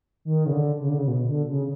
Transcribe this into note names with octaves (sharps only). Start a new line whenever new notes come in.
D#3
C#3
D3
C#3
D3
C#3
B2
D3
C#3